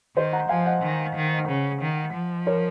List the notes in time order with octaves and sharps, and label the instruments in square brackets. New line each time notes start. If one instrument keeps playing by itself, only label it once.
[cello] D#3 [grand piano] C5 D#5
[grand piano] F#5 A#5
[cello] F3 [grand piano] F5 G#5
[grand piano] D#5 F#5
[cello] D#3
D#3
C#3
D#3
F3
[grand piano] A#4 C#5